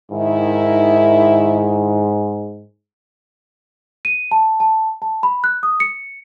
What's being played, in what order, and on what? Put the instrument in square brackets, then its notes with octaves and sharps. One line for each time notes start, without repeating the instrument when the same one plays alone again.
[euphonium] G#2 [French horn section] D#3 E4
[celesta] D#7
A5
A5
A5
B5
F#6
D#6
C#7